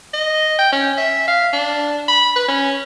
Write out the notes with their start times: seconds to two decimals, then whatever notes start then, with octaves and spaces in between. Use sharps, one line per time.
0.13 D#5
0.58 G5
0.72 C#4
0.97 E5
1.27 F5
1.53 D4
2.08 B5
2.35 B4
2.48 C#4